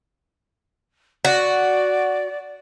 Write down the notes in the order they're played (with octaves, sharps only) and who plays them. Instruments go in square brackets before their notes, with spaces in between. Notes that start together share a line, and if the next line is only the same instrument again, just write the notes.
[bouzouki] F#4 [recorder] D5